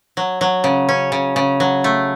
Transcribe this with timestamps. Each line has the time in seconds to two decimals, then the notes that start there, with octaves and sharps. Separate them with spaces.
0.17 F#3
0.41 F#3
0.64 C#3
0.89 C#4
1.12 C#3
1.36 C#3
1.60 F#3
1.84 A3